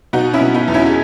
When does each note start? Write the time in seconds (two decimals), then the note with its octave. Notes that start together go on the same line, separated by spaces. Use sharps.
0.13 B2 D#4 F#4
0.33 C#4 E4
0.41 B2
0.54 B3 D#4
0.68 E2
0.74 C#4 E4
0.86 G#4